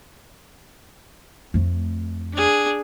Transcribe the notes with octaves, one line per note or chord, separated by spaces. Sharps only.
F2 A3
D4 G#4